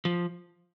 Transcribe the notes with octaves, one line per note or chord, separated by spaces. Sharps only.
F3